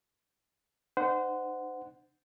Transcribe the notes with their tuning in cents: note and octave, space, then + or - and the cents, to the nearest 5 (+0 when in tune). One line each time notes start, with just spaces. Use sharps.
D#4 -45 C5 -25 F#5 +0